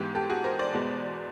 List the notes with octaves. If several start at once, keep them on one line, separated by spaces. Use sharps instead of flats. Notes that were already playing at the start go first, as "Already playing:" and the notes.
Already playing: G#2 E3 G#3 B3 G4
G4 A4
F#4 G#4
A#4 C5
C5 D5
E2 B2 G#3 B3